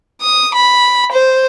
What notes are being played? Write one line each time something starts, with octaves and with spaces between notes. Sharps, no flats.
D#6
B5
C5